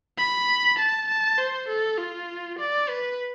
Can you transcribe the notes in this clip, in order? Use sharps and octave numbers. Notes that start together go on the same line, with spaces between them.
B5
A5
A5
C5
A4
F4
D5
B4